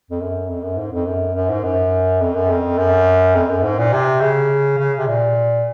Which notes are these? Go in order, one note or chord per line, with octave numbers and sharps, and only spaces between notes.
F2
F#2
F2
F#2
G#2
F2
F#2
F#2
G#2
F#2
F2
F#2
F2
F#2
F2
F#2
G#2
A#2
C3
C#3
C#3
C3
A#2